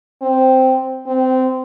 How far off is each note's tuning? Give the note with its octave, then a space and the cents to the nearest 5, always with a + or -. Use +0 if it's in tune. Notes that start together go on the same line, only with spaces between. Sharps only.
C4 -5
C4 -20